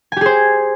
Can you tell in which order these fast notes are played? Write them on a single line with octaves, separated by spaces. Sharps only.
G#5 G4 G#4 C5